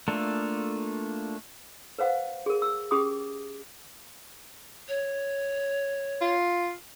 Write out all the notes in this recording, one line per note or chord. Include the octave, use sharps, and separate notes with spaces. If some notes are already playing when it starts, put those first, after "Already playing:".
A3 A#3 D4 F4 A4
B4 C5 F5 F#5
G#4 A#4
E6
C#4 G4 G#4 D6 D#6
C#5
F4